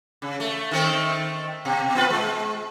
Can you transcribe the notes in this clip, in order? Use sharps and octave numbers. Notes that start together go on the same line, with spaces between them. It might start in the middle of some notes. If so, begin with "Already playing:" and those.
C#3
A3
D#3 A3 C4
B2
B3 F4 B4
G#3